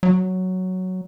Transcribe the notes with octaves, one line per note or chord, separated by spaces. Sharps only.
F#3